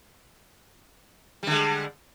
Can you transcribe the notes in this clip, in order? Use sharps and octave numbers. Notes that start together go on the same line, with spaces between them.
D3 G3 G#3